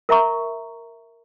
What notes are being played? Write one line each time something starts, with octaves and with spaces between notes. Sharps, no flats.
A#4 E5 A#5 C#6